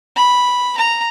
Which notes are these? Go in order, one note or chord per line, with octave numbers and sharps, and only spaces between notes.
B5
A#5